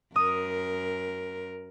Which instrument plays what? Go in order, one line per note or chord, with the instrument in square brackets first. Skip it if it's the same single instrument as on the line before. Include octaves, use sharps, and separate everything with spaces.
[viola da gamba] F#2 A#4 [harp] D#6